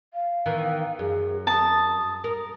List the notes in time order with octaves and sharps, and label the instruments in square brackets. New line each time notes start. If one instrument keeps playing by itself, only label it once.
[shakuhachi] F5
[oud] D#3 E3 B3
[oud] F#2 [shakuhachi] G#4
[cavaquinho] A5 [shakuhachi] D#6
[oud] A#4